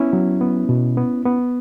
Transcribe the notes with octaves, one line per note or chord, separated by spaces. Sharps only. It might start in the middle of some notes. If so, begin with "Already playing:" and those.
Already playing: B3 C#4 E4
F#3
B3
B2
B3
B3